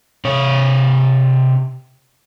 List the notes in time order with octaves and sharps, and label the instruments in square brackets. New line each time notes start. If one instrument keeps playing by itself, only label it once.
[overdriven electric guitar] C3 C#5